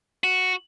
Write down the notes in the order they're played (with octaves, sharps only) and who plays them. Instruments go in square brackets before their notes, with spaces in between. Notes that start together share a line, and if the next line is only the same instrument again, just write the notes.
[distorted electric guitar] F#4